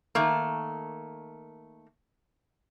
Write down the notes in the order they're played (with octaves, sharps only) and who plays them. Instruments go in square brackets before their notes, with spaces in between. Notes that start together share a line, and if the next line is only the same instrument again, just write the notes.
[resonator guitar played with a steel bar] D#3 A3 A#3